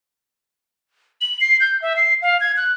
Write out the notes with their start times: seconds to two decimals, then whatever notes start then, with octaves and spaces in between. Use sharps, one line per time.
1.21 F#7
1.41 C7
1.60 G6
1.82 E5
1.96 C7
2.22 F5
2.41 G#6
2.57 F#6